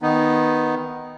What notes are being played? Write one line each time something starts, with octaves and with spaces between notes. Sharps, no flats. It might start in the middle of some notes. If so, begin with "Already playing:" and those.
D#3 B3 D#4